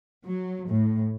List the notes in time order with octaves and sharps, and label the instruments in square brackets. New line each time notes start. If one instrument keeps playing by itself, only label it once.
[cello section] F#3
A2